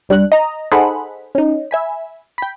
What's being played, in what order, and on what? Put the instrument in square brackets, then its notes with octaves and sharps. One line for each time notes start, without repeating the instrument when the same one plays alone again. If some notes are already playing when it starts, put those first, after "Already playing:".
[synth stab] C2 G3 D4 F#6
D#5 A#5
D#4 G#4 A4 C5 F#5 B5
C#4 D#4
E5 G#5 B5
G5 B5